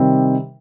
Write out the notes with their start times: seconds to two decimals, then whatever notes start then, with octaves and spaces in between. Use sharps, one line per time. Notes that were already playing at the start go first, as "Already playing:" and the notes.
Already playing: C3 D#3 G3 C4